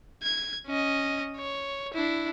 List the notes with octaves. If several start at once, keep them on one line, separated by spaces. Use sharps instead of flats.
G#6
C#4 D#5
C#5
D4 E4